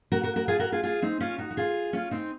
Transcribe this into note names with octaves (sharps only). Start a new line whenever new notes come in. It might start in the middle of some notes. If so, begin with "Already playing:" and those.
F#4 A#4
F#4 A#4
F#4 A#4
F4 G#4
F#4 A#4
F4 G#4
F4 G#4
C4 D#4
C#4 F4
D#4 F#4
F#4
F4 G#4
C#4 F4
C4 D#4